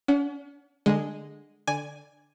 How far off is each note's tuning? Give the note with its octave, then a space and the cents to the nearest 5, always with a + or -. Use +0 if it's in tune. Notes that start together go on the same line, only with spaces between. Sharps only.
C#4 +45 F#5 +0
D3 +20 G#3 +0
D3 +0 D5 +0 G#5 +0